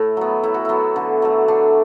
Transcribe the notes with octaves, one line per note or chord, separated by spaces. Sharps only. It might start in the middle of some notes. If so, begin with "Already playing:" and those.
Already playing: A2 A3 E4
F#3 B3
A2 E4
F#4
F#3 B3 E4
D3
F#3 A3
D3 D4